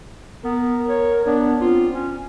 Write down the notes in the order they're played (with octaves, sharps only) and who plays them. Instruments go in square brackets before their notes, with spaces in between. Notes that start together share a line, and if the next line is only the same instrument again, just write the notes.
[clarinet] B3 [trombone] A#4
[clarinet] C#5
[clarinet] B3 [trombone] D4
[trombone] C4 [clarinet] F4
[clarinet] C#4